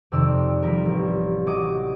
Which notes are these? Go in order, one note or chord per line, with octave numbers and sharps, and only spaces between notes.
F2 C3 D#3 D5 E6
F3 G3 G4 A#4
A1
F#3 D#5 D6 D#7